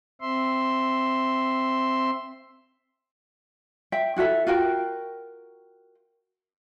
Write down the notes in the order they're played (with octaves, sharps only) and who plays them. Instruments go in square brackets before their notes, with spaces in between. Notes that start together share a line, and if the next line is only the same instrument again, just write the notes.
[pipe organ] C4 E5 C6
[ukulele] E5 G5
E4 F#4 A4 E5
F4 F#4 A#4 G5